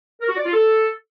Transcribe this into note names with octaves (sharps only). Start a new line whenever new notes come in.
A#4
F#4
D5
F4
A4